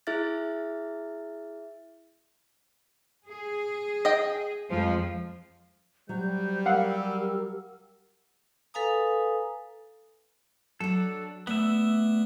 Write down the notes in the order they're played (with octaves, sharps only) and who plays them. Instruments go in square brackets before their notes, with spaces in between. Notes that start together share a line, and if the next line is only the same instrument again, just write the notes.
[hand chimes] E4 G#4 E5 F6 A6
[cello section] G#4
[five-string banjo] D#5 G5
[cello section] F2 F3 G#3
[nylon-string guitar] F#3 [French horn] G3 [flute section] C5 G6
[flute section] G4 A#4 E6 [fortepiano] F5 F#5
[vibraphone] A4 B4 F5 G#5 A#5 D#6
[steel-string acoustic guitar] F#3 D4 [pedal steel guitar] A4
[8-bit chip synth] A3 [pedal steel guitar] B3 E5 [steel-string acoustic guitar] D5